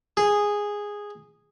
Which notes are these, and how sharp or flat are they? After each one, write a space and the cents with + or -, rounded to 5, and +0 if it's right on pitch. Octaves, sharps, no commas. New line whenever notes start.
G#4 -10